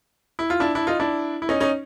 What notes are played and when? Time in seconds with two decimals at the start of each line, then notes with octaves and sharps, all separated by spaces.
0.39 E4
0.50 F4
0.60 D4 E4
0.75 D4 E4
0.87 D#4 F4
1.00 D4 E4
1.42 E4
1.49 C#4 D#4
1.60 C#4 D#4